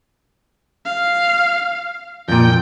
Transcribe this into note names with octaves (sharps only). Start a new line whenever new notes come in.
F5
F2 A#2 G5